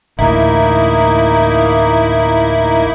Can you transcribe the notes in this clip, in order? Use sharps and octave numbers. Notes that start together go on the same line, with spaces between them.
A1 D2 A#3 D#4 E4